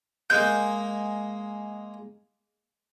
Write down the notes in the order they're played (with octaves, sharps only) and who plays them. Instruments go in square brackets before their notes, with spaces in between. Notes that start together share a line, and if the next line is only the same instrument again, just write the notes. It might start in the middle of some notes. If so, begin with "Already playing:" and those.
[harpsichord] G#3 A#3 [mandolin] G6